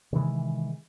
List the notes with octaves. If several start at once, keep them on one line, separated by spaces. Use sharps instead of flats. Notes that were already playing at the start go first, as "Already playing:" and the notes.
C3 D#3 E3 G#3